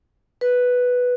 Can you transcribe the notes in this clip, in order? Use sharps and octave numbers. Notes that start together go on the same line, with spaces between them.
B4